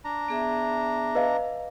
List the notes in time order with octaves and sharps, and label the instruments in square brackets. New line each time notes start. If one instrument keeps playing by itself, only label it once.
[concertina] D4 A#5
[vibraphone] B3 G#4 E5
[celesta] B4 D#5 F5